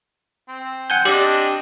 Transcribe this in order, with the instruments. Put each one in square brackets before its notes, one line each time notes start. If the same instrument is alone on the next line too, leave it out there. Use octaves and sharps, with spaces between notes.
[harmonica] C4
[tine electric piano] F#5 G#5 G6
[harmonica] C4 D4 D#5 [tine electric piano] G4